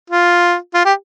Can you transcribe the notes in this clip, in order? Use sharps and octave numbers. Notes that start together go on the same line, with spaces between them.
F4
F4
G4